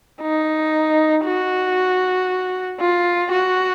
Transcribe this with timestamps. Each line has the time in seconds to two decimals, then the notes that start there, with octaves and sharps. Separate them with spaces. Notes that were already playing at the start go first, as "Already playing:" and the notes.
0.22 D#4
1.25 F#4
2.80 F4
3.32 F#4